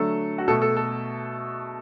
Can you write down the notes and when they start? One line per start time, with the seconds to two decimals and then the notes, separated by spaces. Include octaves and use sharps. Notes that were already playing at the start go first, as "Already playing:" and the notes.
Already playing: D3 F#3 A3 A4
0.38 F#4
0.48 B2 A3 A4
0.62 A4
0.77 A4